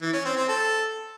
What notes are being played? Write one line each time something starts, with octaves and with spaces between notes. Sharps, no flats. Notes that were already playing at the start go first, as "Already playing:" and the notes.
E3
C#4
C4
C4
A4